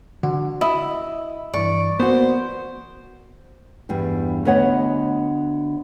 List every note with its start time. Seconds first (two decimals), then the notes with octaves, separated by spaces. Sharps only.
0.23 D3 F#4
0.61 E4 D#5
1.54 G2 E3 D5 C#6
2.00 A#3 B3 F#4 C5
3.89 E2 G2 G3 B3
4.45 D2 B3 C#5 D#5 F#5